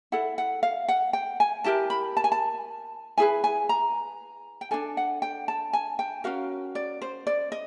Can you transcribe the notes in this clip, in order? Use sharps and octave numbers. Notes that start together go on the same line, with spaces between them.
E4 A4 F#5
F#5
F5
F#5
G5
G#5
E4 G4 A#4 A5
B5
A5
G#5
A5
E4 G#4 B4 G#5
G#5
A#5
G5
D4 F#4 A4 G#5
F#5
G5
A5
G#5
G5
C#4 F#4 A#4 F5
D5
C5
D5
D#5